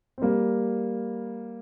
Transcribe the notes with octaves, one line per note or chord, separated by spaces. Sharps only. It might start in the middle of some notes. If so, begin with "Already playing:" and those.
C4
G3 A#3